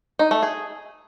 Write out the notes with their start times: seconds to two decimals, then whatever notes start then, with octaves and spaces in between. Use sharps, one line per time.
0.19 D#4
0.31 A3
0.43 G#4